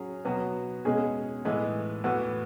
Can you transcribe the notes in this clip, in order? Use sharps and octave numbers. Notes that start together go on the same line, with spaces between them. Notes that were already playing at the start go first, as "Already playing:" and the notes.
Already playing: F#3 C#4 G#4
B2 F#3 B3 F#4
B2 G#3 C#4 G#4
A2 E3 G#3 B3
A2 E3 B3 F#4